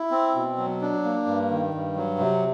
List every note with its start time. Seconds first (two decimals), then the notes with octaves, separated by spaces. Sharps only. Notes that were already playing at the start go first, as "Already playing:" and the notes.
Already playing: E4
0.11 C4
0.35 B2
0.58 F#3
0.81 D4
1.04 A#3
1.27 G2
1.50 D#3
1.74 G2
1.96 F#3
2.19 C3